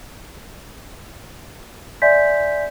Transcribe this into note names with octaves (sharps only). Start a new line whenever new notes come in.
D5 E5 G#5 C6 G6 B6